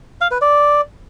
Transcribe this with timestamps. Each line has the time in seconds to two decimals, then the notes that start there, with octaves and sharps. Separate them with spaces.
0.21 F5
0.31 B4
0.41 D5